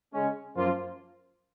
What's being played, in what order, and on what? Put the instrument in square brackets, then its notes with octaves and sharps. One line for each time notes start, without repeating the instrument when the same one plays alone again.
[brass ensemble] C#3 G#3 C#4
F#2 F3 A#3 F4